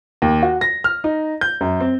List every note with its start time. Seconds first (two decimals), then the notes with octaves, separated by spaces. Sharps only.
0.22 D#2
0.43 F#4
0.61 A#6
0.84 F6
1.04 D#4
1.41 G6
1.61 F#2
1.81 C4